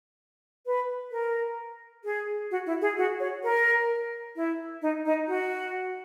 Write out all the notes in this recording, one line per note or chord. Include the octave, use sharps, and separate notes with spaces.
B4
A#4
G#4
F#4
E4
G#4
F#4
C#5
A#4
E4
D#4
D#4
F#4